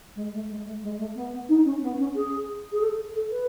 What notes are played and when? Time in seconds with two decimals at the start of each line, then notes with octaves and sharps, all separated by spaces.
0.16 G#3
0.33 A3
0.50 G#3
0.66 A3
0.83 G#3
0.98 A3
1.15 B3
1.33 B3
1.49 D#4
1.65 C#4
1.82 B3
1.99 C#4
2.15 G#4
2.72 G#4
2.81 A4
3.15 A4
3.31 B4